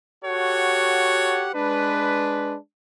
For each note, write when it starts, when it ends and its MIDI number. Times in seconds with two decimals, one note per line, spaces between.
0.25 1.50 66
0.25 1.50 67
0.25 1.50 69
0.25 1.50 73
0.25 1.50 78
1.55 2.55 56
1.55 2.55 62
1.55 2.55 71